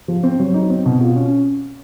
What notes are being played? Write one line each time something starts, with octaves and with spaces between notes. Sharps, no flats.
F3
C4
F#3
D#4
C4
B2
F4
C#4